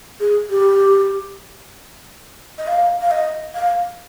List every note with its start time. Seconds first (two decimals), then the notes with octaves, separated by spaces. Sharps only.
0.20 G#4
0.50 G4
2.58 D#5
2.67 F5
3.02 F5
3.11 D#5
3.55 F5